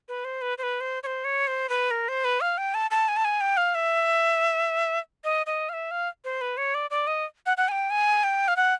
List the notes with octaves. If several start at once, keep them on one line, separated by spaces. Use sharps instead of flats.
B4
C5
B4
C5
B4
C5
C#5
C5
C#5
C5
B4
A#4
C5
B4
F5
G5
A5
A5
G#5
A5
G#5
G5
F5
E5
D#5
D#5
F5
E5
F5
C5
B4
C#5
D5
D5
D#5
F#5
F#5
G#5
G5
G#5
G5
F5
F#5